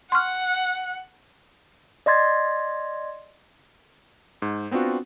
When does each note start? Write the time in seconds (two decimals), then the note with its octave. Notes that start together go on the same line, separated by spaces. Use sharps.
0.12 F#5 C6 C#6 F6
2.06 D5 D#5 C6 G#6 A6
4.42 G#2
4.71 B3 C4 D4 F4 F#4